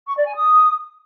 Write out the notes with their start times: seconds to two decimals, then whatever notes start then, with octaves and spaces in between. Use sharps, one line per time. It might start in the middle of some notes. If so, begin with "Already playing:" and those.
0.07 C#6
0.17 D5
0.26 G#5
0.36 D#6